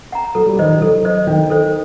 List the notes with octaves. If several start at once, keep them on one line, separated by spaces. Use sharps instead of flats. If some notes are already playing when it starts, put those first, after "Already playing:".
F#5 A#5
F#3 A4
G3
D#3 C5 D#5
D#3
F#3 A4
C5 D#5
D#3 D4
A4 C5